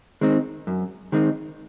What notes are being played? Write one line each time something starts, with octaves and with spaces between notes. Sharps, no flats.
D#3 G#3 C4 D#4
F#2
D#3 G#3 C4 D#4